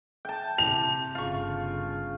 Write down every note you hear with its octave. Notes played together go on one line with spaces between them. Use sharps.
G5 A5
C3 F7
G1 C#3 F4 C#6